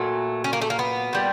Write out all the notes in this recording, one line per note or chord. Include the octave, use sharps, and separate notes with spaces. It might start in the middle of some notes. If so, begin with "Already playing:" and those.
Already playing: A#2 F#3 A3
C#4
A#3
A3
A#3
B3
A#2 G3